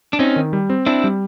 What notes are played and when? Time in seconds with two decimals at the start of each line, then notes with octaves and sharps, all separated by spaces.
0.13 D4
0.19 C4 C#4 D#4
0.36 D#3
0.53 G3
0.70 C4
0.86 C4 D4 E4
1.04 G3